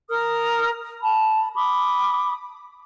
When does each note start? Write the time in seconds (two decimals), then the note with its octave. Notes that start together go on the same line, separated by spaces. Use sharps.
0.09 A#4 D#6 F6
1.02 A5 B5
1.55 B5 D6 D#6